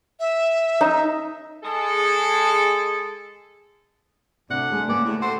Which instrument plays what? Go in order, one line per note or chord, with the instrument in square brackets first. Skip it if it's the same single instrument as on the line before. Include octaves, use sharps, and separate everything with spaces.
[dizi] E5
[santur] D#4
[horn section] G#3 G#4 A4
[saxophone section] D2 D4 F#5 [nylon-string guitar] C3
[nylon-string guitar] G3 G#3 G#4
[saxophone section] C#3 B3 D5 [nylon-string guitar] A#3 G#5
[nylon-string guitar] D2 G4 [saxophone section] A2
[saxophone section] F#4 A4 C5